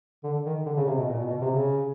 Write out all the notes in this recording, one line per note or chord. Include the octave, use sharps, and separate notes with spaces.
D3
D#3
D3
C#3
C3
B2
A#2
B2
B2
C3
C#3